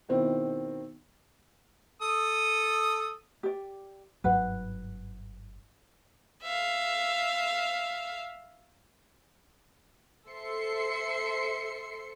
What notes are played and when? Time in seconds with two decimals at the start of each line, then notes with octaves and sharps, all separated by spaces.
0.08 B2 D#3 C4 E4
2.02 A4 D#6
3.43 G4 D5
4.24 G1 G#2 F#3 B4 F#5
6.43 E5 F5
10.28 A4 C5 E5 C6 C7 C#7